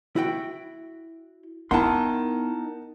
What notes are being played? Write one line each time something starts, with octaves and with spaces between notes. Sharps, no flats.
E4 F#4 G5
B3 D#4 E4 A#4 F#5 A5 C6